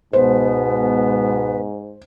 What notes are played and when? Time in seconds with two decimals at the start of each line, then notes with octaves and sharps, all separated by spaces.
0.13 C#2 G#2 B2 B3 B4 C5